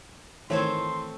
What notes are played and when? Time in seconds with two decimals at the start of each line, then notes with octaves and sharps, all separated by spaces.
0.50 D#3 E3 A3 C4 C5 C#5 C6